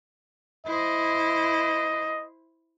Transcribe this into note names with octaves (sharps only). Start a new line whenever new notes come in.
E4 C5 D#5